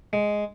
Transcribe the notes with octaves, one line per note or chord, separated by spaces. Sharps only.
G#3